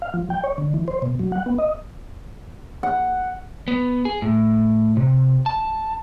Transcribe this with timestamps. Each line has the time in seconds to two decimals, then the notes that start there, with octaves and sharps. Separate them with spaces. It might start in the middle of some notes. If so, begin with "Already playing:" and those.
0.02 F5
0.14 F3
0.30 G5
0.44 C#5
0.58 D3
0.74 E3
0.88 C5
1.02 B2
1.19 F#3
1.32 F#5
1.46 B3
1.59 D#5
2.83 F#5
3.68 B3
4.05 G#4
4.22 A2
4.97 C3
5.46 A5